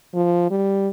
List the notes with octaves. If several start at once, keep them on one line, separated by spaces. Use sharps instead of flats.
F3
G3